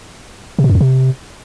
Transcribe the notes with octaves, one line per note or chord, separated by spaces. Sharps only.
C3
B2
F#2
F2
C3